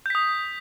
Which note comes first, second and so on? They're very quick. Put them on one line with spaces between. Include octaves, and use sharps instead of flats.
G6 B6 D#6